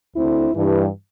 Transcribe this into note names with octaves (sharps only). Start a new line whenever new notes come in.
D2 D3 C4 E4
G2 E3